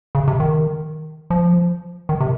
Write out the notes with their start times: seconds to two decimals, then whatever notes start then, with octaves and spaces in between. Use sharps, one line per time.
0.15 C#3
0.28 C3
0.40 D#3
1.30 F3
2.09 D#3
2.21 C3